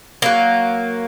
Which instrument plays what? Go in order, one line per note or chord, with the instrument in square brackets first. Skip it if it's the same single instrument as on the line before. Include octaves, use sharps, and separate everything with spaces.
[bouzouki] F#3 A#3